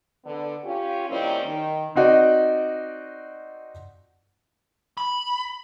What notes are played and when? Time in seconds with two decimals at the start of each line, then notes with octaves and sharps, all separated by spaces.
0.24 D3 B3
0.64 C#4 F4 G4
1.09 D#3 G3 A#3 C4 C#4 E4
1.45 D#3
1.96 C4 D#4 F#4 D5 D#5
4.97 B5